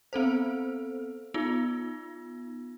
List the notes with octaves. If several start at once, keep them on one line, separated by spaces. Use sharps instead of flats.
B3 C4 A4 C5
B3 D#4 F4